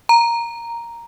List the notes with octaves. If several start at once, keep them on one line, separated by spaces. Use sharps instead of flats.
A#5